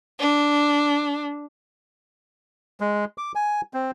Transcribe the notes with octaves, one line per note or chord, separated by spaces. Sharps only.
D4
G#3
D6
G#5
C4